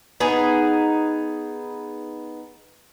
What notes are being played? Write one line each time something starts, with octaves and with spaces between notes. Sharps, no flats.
B3 D#4 G#4